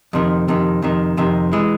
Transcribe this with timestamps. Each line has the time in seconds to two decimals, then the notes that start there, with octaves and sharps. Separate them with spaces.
0.13 F2 C3 D#3
0.48 F2 C3 D#3
0.82 F2 C3 D#3
1.17 F2 C3 D#3
1.53 E3 G#3